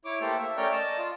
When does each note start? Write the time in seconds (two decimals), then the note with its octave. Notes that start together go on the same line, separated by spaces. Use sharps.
0.05 E4 C#5 D6
0.21 A3 A#3 G4 A4 C5
0.39 E5
0.57 A3 C#4 A#4 C#5 D5 G5
0.72 D5 D#5 A5
0.98 F4